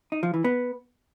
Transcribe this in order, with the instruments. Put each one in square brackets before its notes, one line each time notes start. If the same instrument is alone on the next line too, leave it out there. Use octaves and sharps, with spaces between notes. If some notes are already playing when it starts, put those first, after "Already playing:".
[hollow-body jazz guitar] D#4
F3
E3
B3